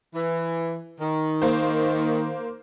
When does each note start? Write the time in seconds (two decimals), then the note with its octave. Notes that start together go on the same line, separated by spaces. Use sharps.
0.15 E3
1.01 D#3
1.42 A#3 C5